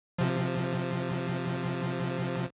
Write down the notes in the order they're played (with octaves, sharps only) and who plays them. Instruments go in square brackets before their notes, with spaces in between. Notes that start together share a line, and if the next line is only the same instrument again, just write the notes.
[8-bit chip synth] C3 F3